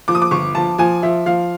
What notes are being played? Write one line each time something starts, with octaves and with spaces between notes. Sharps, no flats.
F3 D6
D#6
D6
G1 C#6
F3 A5
F3 G#5
F3 E5
F3 F5